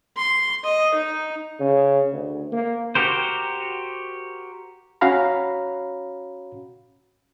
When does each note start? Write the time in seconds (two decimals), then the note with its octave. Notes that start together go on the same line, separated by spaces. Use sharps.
0.17 C6
0.64 D#5
0.95 D#4
1.60 C#3
2.12 D2
2.52 A#3
2.95 F#4 G4 A#4 C5
5.01 C#4 F#4 C#5 F5 A#5 B5